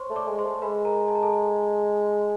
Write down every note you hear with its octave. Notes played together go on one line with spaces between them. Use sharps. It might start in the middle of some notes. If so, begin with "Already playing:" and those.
Already playing: C5 C#5 C6 C#6
A3
D5 D6
G#3
C5 C6
A3
G#3 B4 B5
A#4 A#5
A5
A#5
A4 A5